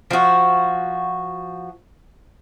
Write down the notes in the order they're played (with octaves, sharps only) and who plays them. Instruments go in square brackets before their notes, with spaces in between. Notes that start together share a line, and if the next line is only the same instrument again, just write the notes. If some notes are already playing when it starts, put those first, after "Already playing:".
[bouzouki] F3 F#4